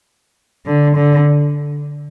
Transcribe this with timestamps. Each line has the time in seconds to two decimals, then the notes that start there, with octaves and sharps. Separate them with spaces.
0.66 D3
0.96 D3